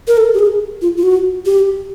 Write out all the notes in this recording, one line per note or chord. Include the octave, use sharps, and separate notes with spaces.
A#4
A4
G4
G#4
F4
F4
F#4
G4